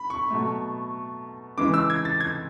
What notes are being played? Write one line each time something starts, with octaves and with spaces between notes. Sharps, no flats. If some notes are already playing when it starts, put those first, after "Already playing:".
Already playing: B5
C#6
B2 F#3 A3
C#3 E3 G#3 D6
E6
G#6
A6
G#6